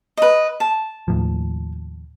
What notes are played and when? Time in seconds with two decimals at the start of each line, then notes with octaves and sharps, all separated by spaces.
0.17 B4 D#5
0.60 A5
1.08 D#2 A2 F3